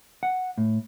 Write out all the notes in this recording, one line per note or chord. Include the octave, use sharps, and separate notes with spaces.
F#5
A2